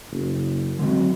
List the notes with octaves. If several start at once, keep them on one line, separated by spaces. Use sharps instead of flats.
F#1
D3 F#3 G#3 C4